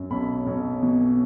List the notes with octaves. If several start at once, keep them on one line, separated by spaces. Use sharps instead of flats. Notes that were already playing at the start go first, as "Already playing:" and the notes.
Already playing: F#2
B1 B5
B1
B2